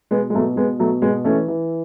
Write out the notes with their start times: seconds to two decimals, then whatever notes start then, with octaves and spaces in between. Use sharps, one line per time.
0.11 B2 G#3 B3
0.30 G#3
0.34 B2 F#3 A3
0.56 B2 G#3 B3
0.79 B2 F#3 A3
1.02 B2 G#3 B3
1.24 E3 A3 C#4
1.48 E3